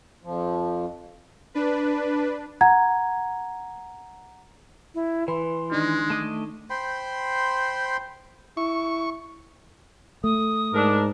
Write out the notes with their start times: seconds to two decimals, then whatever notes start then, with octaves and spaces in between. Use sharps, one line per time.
0.23 F2 F3
1.54 D4 B4
2.61 F#5 A#5 G#6
4.95 E4
5.28 E3 B4 C6
5.72 D#3 G#3 D4 D#4
6.10 A3 D#5 D6
6.70 C5 G5 B5 C6
8.57 E4 C#6
10.24 A3 D#6
10.73 G#2 D4 A#4